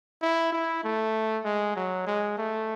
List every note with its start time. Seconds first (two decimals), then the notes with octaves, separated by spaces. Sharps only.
0.22 E4
0.52 E4
0.84 A3
1.45 G#3
1.76 F#3
2.07 G#3
2.38 A3